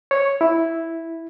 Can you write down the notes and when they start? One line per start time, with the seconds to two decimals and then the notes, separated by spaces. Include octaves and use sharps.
0.11 C#5
0.41 E4